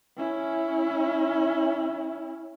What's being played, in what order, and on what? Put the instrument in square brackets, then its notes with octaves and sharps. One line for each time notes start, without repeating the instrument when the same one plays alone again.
[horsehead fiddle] C#4 E4